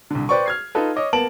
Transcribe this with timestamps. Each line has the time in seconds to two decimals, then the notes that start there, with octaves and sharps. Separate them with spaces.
0.11 C2 D3
0.29 B4 C5 D5 G5 C#6
0.46 F6 G#6 C7
0.75 D#4 F4 A4 B4
0.96 C#5 D#5 D6
1.13 A#3 B3 A5 D7 F#7